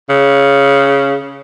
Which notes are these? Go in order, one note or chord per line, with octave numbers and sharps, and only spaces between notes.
C#3